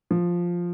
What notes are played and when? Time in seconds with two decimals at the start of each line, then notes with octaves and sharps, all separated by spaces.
0.11 F3